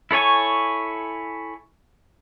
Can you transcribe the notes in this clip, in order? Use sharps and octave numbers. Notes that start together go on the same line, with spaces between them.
E4 A4 C#5 G#5 C#6